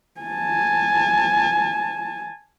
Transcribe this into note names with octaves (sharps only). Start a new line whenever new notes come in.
G#5 A5